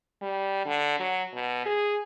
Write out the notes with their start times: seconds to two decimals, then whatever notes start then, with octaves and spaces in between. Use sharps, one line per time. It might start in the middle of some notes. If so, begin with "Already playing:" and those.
0.22 G3
0.66 D3
1.00 F#3
1.34 B2
1.66 G#4